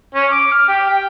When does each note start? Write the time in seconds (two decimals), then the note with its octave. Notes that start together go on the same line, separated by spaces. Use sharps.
0.15 C#4
0.31 D6
0.52 F6
0.69 G4
0.90 G5